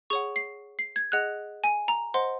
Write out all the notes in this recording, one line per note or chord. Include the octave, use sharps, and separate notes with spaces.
G#4 C#5 F#5 C#6
C7
C7
G#6
G#4 D#5 F#5 F#6
G#5
A#5
C5 D#5 F#5 C6